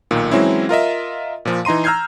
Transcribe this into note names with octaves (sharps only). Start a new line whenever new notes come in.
B1 A#2 D#3
E3 F#3 G#3 C4 C#4 E4
F4 A#4 D#5 E5
A#2 F3
E3 D#4 A#5 C6 D#7
A#5 E6 F6 G6 G#6 C7